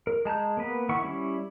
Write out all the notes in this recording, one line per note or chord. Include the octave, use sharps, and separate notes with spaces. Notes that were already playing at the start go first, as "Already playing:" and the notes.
A#4
G#3 A5 A#5 G6
A#3 B3 B4
D#3 E4 A#4 F#5 C#6
G3 C#4 E4 C#6